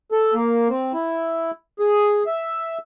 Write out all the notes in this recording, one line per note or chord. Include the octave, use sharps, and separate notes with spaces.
A4
A#3
C4
E4
G#4
E5